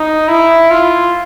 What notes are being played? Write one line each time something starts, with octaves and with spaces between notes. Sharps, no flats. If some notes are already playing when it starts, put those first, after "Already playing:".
Already playing: D#4
E4
F4